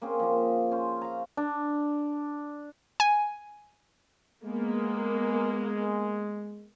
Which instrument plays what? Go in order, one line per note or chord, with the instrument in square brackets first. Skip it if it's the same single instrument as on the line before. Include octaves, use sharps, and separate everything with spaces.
[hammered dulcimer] A#3 C4 C#4 G#4
F3 A#3
C#4 C5
F5 A#5
D4
[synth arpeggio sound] G#5
[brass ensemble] G#3 [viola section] A#3 B3